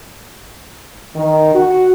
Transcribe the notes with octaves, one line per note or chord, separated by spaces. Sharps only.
D#3
F#4